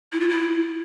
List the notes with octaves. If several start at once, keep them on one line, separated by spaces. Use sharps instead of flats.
E4
F4
E4